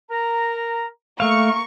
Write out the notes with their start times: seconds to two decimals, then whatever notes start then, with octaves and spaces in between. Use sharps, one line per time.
0.10 A#4 A#5
1.20 A3 A#3 A#4 F5 C#6